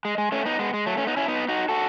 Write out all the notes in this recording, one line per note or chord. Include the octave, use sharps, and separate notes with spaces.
G#3
G#3
A3 C#4
B3 D#4
G#3 B3
G#3
F#3 A3
A3 C#4
B3 D#4
C#4 E4
B3 D#4
D#4 F#4
F#4 A4